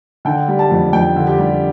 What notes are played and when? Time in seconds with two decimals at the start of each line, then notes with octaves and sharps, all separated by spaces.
0.25 D3 G5
0.48 G3
0.59 A5
0.71 F2
0.93 F2 G5
1.16 D3
1.27 G4
1.38 G3